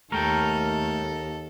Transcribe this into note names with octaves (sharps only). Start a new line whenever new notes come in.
D#2 A3 A4 A#4 G5